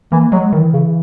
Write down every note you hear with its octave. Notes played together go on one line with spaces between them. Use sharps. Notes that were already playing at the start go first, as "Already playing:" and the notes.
E3 A#3
F#3 G#3
D#3 E3
C#3